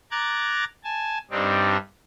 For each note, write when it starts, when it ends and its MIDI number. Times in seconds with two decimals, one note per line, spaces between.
0.11 0.64 82
0.11 0.64 86
0.11 0.64 90
0.11 0.64 92
0.11 0.64 93
0.84 1.18 80
0.84 1.18 81
1.31 1.77 43
1.31 1.77 55
1.31 1.77 60
1.31 1.77 62
1.31 1.77 63